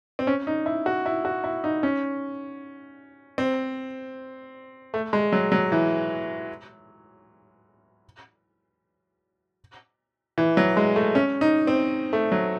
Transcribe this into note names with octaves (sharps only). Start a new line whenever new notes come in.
C4
C#4
D#4
E4
F#4
E4
F#4
E4
D#4
C#4
C4
A3
G#3
F#3
F#3
E3
E3
F#3
G#3
A3
C#4
D#4
C4
A3
F#3